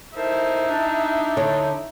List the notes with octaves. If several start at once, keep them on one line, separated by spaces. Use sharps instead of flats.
D#4 E4 A4 A#4 C5
D4
D3 C#5